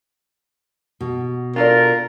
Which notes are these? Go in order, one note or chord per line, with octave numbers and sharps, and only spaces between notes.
B2
D4 F4 A4 A#4 D5